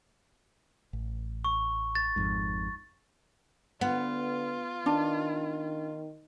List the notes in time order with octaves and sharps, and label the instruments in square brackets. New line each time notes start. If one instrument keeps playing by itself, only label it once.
[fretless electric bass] A1
[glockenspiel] C#6
A6
[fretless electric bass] G#1 F2 G#2
[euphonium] D3 [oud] B3 [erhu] F4
[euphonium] D#3 [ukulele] D4